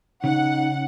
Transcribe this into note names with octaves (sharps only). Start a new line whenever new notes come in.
C#3 D#4 F#5